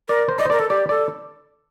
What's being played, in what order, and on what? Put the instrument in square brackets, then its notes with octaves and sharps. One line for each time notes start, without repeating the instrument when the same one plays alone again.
[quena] A#4 [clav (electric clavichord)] D5
[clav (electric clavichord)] C5
[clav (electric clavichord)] D5 [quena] D#5
[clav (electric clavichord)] C5
[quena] A#4 [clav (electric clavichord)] D5
[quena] A4
[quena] G4 [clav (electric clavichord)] D5
[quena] A4 [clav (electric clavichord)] D5